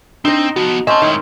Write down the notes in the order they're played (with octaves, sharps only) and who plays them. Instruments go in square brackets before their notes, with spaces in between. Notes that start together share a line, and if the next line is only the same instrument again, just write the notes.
[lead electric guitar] C4 [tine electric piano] D4 [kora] D#4 D#5
[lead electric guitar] F3 B3 [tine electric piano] F#4
[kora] C4 C#4 [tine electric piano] D#5 [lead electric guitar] E5 A5
[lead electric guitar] G#2 E4 [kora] D#3